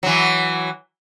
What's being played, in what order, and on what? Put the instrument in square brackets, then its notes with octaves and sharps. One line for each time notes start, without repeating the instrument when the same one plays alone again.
[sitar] E3 F#3